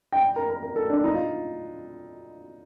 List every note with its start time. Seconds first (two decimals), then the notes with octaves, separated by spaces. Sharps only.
0.12 G5
0.36 A#4
0.50 A#4
0.63 A#4
0.76 A4
0.89 D4
1.04 D#4
1.14 F4